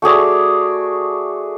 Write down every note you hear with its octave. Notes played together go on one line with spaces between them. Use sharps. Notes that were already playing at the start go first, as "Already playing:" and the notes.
A3 F#4 G#4 D5